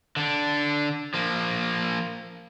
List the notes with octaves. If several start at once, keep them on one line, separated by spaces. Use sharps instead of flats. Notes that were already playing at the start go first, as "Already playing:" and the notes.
D3 D4
F3 A#3